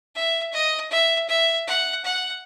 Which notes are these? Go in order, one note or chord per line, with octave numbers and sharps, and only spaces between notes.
E5
D#5
E5
E5
F#5
F#5